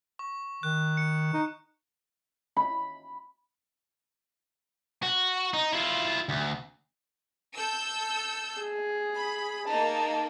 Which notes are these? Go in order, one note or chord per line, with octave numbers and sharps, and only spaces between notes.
C#6
D#3 F#6
C#7
D#4
B5
F#4
D#4
E4 F4
D2
A4 E6 G6
G#4
B5
A#3 D#4 A5